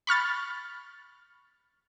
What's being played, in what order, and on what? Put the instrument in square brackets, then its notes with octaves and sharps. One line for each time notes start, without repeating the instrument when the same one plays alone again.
[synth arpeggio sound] B5 C#6 F6 A6